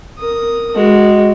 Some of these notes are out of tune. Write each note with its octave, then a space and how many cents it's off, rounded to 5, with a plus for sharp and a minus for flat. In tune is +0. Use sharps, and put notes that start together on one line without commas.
A#4 -5 D#6 +0
G#3 +0 F#4 +0